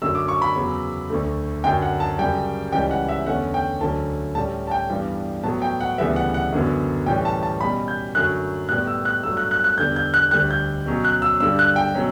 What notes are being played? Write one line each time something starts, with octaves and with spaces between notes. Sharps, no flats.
F#2 D3 F#3 A3 C#4 E6
D6
C#6
B5
E2 C#3 F#3
D2 D3 A3
F#2 D3 F#3 G5
F#5
A5
F#2 C#3 G3 G5
C#2 C#3 E3 G3 C#4 G5
F#5
E5
E2 D3 A3 C#4 F#5
G5
D2 D3 F#3 A3 C#4 A5
A2 G3 C#4 A5
A5
G5
G2 E3 G3 B3
A2 F#3 B3 A5
G5
F#5
D2 C#3 E3 G3 B3 E5
F#5
F#5
F#2 D3 F#3 B3
A2 E3 G3 C#4 G5
A5
A5
B2 G3 C#4 B5
G6
F#2 D3 F#3 A3 F#6
A2 G3 B3 F#6
E6
F#6
G2 F#3 A3 E6
F#6
F#6
F#6
E2 D3 G3 G6
G6
F#6
D2 D3 G3 F#6
G6
B2 F#3 C#4
F#6
E6
G2 D3 G3 E6
F#6
G5
B2 F#3 C#4